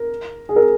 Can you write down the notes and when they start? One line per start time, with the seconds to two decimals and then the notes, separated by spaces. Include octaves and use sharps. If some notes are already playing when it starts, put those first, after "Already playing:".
Already playing: A#4
0.49 G#4
0.56 A#4